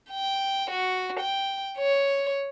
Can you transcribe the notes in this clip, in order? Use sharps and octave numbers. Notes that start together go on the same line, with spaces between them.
G5
F#4
G5
C#5